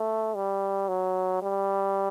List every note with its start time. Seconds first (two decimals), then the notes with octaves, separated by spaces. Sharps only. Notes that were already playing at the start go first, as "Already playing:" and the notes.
Already playing: A3
0.35 G3
0.89 F#3
1.43 G3